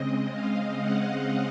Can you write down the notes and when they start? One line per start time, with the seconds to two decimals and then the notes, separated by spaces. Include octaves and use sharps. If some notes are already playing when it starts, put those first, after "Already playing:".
Already playing: C#3 G#3 C4 D#5
0.32 F5
0.80 F#5